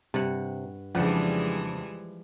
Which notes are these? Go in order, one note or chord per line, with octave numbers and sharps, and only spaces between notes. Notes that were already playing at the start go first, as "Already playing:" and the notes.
G2 C3 F#5
F2 C#3 E3 F3 G3 G#3 D4 F#5